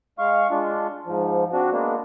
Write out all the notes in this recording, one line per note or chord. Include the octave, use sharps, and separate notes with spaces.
G#3 F5 C#6
G#3 D4 F4
G#2 F3
C4 D4 F#4
G#3 A#3 B3 D4